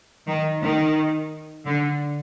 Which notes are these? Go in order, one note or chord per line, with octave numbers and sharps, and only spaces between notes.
D#3
D#3
D3